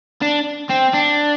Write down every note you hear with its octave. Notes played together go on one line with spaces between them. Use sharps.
D4
C4
D4